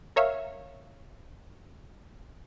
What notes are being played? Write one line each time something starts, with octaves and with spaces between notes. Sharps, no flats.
A#4 C#5 E5 F5